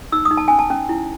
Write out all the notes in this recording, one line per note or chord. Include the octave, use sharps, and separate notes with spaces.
D#4 E6
D#6
D#4
A5
C#4 G#5
A5
C#4
E4